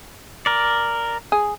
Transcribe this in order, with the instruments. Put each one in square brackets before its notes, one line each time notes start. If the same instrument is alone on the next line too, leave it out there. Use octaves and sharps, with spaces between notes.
[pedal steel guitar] A#4 D5
[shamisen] G#4